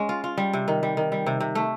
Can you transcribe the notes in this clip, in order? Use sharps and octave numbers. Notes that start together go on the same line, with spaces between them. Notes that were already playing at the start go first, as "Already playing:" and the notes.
Already playing: G#3 C#4
F4
F4
G3
C3
D#3
G3
D#3
G3
C3
C3
A3